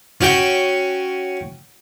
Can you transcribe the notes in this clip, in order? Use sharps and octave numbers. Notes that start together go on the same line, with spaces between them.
C#4 F#4 G5